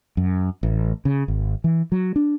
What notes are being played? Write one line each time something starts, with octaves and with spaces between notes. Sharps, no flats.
F#2
A1
C#3
G#1
E3
F#3
D4